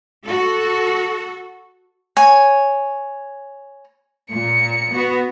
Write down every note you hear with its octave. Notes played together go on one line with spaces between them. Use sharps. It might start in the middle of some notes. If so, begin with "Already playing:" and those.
F#4 A4
C#5 G#5
A#2 C#7
B3 F#4